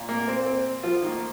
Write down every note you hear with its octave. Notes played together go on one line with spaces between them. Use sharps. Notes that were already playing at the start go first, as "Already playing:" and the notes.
Already playing: A#2
A#3
C4
C4
F3 F4
D#3 A#3